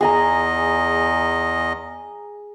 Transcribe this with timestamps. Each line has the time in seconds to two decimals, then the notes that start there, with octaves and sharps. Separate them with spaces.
0.01 E2 G#4 D#5 G#5 A#5